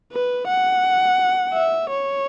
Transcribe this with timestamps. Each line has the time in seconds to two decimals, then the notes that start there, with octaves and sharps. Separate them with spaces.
0.13 B4
0.48 F#5
1.54 E5
1.90 C#5